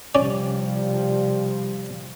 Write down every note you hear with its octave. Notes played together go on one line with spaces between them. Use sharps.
C3 F3 G3 C#4 D5